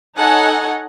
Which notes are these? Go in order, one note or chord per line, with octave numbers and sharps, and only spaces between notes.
D#4 A4 C#5 D#5 F#5 G#5